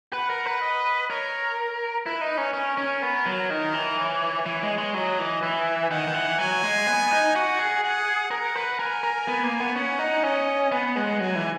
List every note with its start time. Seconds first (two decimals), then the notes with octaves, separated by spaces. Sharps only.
0.13 B4 F#5
0.30 A#4
0.46 B4
0.61 D#5
1.09 A#4 C#5
2.06 E4 B4
2.21 D#4
2.37 C#4
2.53 C#4 A#4
2.77 C#4
3.02 B3 A#4
3.26 F#3
3.50 D#3 A#4
3.74 E3
3.98 C#5
4.46 E3
4.63 G#3
4.78 G#3
4.94 F#3 D#5
5.19 E3
5.42 E3 E5
5.91 D#3 F#5
6.07 D#3
6.14 E3
6.38 F#3 G#5
6.63 G#3
6.87 B3
7.11 D#4
7.35 F#4 F#5
7.59 G#4
7.83 F#5
8.31 A#4 F#5
8.55 B4
8.79 A#4 G#5
9.03 A#4
9.28 B3
9.43 A#3
9.60 B3
9.75 C#4 F#5
9.99 D#4
10.23 C#4 D#5
10.72 B3 F#5
10.96 G#3
11.20 F#3 G#5
11.36 E3